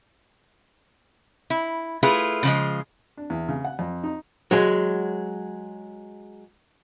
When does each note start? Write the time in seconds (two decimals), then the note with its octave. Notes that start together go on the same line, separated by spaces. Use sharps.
1.50 E4
2.03 A3 E4 F4 G#4 B4
2.43 C#3 F3 G#3
3.17 D4
3.30 E2
3.49 C#3
3.65 F#5
3.79 F2
4.03 D#4
4.51 F#3 G#3